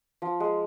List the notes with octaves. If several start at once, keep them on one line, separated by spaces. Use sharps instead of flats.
F3
G#3